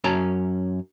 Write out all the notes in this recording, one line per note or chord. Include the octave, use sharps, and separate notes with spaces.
F#2 C#4 A5 A#5